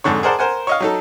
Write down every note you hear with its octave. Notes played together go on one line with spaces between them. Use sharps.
F2 G#2 D3 C#5
G#4 A#4 C5 D5 F#5 A5
A#4 C5 F#5 G#5
C#5 D#5 F5
F#3 D#4 A4